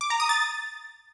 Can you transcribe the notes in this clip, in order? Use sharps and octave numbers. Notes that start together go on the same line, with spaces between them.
D6
A#5
D#6
A6